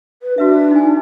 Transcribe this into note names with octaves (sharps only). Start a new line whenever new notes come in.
B4
D4 F#4 B4 E5
D#4 G#5